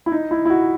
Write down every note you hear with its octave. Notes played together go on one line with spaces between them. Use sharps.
E4
D#4
E4
E4
F#4